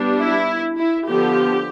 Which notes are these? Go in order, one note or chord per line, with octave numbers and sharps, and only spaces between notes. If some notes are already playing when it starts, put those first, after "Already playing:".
Already playing: G3 B3 D4
E4
E4
D3 F3 B3 G4